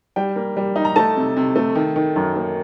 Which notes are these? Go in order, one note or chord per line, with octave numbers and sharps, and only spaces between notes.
G3 G5
A#3
G3
D#4
A#5
A3 A5
C3
C3
A3
D#3
D#3
F#2
A#3